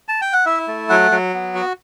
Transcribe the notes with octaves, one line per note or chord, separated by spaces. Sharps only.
A5
G5
F#5
E4 E5
A3
F#3 F#5
F#3
B3
F#4